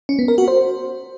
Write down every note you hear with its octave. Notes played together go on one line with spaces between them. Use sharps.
C#4
B3
A#4
F#4
C5